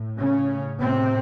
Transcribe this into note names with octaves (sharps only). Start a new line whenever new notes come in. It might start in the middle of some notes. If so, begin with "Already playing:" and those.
Already playing: A2
C#3 C#4
A2 C3 C4